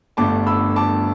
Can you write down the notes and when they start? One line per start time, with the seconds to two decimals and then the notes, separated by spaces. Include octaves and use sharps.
0.17 G1 G2 D3 A3 A5 D6
0.47 B5 E6
0.76 A5 D6